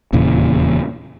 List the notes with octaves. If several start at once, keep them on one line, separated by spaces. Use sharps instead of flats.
D#1 E2 A#2 C#3